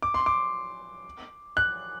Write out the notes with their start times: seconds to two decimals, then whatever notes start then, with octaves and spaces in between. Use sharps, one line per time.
0.02 D6
0.14 C6
0.26 D6
1.57 F#6